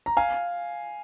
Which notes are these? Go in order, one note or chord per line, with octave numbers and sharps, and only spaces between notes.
A#5
F5 G#5